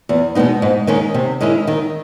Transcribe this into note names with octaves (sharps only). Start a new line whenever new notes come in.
E2
B2 G#3 B3 D#4
G#2
D#3 G#3 C#4
C3
D#3 G#3 C#4 E4
D#3